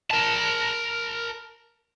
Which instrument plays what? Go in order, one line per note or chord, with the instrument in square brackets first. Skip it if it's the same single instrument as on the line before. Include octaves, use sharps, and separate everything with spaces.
[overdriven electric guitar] A#4 A5